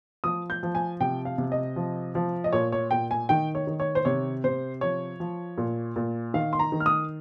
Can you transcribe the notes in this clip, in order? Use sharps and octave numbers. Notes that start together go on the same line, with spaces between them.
F3 D#6
G6
F3
G#5
C3 G5
F5
C3
D#5
F3
F3
D#5
A#2 C#5
C#5
A#2 G5
G#5
D#3 G5
C#5
D#3
C#5
C5
C3 C#5
C3 C5
F3 C#5
F3
A#2
A#2
D#3 F5
C6
A#5
D#3
F6
D#6